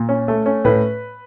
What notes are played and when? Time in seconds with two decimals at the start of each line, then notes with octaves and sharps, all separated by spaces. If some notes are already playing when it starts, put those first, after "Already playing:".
Already playing: A#2
0.09 C#4
0.28 A3
0.46 C#4
0.65 A2 B4